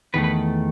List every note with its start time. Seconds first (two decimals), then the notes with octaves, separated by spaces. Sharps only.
0.14 E2 D#3 A3 B4
0.24 B4